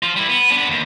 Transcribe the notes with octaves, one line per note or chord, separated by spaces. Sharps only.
F3 F4
G3 E4
B3
B3 D4
D#2